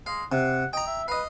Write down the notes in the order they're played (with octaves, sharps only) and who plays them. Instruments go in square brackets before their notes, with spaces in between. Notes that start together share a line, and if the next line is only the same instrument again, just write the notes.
[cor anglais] G#3 [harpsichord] F5
[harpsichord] C3 [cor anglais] F#5
[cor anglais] D#5 [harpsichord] G5 A#5
[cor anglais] E5
[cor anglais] B4 [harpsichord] D#5 F5